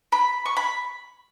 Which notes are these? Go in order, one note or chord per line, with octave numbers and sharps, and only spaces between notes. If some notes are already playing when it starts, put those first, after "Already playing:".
B5
C#6
B5